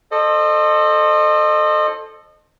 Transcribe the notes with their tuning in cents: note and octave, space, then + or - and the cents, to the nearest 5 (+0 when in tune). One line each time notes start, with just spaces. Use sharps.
A4 +0 C5 +20 D#5 -30